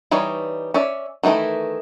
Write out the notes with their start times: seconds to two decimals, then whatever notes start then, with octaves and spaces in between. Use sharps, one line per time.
0.11 E3 G3 D#4 C#5
0.74 C#4 D5 E5
1.23 D#3 E3 A3 D#4 E4